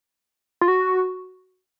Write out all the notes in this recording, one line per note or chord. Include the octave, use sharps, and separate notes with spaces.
F4
F#4